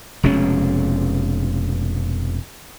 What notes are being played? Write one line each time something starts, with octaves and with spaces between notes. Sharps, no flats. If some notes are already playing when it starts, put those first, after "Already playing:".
F1 B2 G#3 C#4